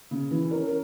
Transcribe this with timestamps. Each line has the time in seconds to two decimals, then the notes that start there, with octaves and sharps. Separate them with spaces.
0.11 C#3
0.31 E3
0.51 C#4 A#4
0.67 A#4